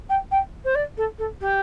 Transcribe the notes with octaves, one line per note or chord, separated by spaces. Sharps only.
G5
G5
C5
D5
A4
A4
G4